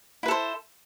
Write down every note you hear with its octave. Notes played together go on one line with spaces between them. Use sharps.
E4 A4 B4 C5